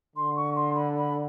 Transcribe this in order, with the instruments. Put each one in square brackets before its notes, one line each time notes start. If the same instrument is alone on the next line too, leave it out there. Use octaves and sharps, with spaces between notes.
[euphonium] D3 [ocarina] C6
[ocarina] C#6
C6
B5
B5